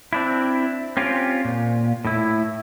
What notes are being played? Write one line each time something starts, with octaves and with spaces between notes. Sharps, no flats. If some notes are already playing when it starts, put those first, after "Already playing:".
C4 D4 E4
C4 C#4 F4 G4
A#2
A2 E4